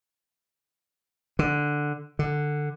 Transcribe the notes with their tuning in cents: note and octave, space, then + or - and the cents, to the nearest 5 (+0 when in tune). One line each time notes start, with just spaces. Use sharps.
D3 +5
D3 +10